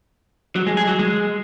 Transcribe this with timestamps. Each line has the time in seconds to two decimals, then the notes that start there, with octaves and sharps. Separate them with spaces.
0.56 F#3
0.67 G#3
0.77 G#4
0.87 F#3
0.99 G#3